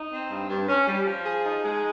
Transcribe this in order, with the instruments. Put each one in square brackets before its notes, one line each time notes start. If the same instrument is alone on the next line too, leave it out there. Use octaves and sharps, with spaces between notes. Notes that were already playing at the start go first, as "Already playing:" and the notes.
Already playing: [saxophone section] D#4
C4
G2
G2
C#4
G3
F3
G#4
D#4
G#3